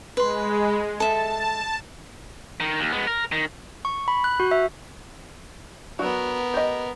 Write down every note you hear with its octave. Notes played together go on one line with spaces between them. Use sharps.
G#3 B4 C6
A4 E5 A5
D#3
D#2
G#3 B3
A#4
D#3
C#6
B5
F#6
F#4
E5
F#3 B3 D4 F#4 A#4
G4 D#5